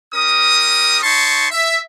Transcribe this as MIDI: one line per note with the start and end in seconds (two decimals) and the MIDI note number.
0.14 0.98 61
0.14 0.98 67
0.14 0.98 70
0.14 0.98 87
1.02 1.46 63
1.02 1.46 73
1.02 1.46 81
1.02 1.46 84
1.02 1.46 85
1.50 1.78 76